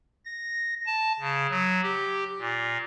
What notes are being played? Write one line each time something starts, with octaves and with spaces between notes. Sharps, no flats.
A#6
A5
C#3
F#3
G4
A#2